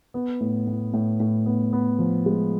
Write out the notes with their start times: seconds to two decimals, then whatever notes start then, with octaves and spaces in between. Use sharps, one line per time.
0.14 B3
0.40 A2
0.67 A2
0.93 A2
1.20 A2
1.46 B3
1.73 B3
1.99 F3
2.26 G#3